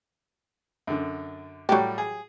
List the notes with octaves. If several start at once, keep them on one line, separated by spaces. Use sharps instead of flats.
F#2 D3
A2 F#3 G3 G4
G#4